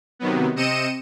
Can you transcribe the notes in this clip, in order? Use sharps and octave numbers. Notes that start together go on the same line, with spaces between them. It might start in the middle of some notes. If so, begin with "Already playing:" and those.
C3 D#3 F#3 B3
C3 C4 D#5 C#7 D#7 E7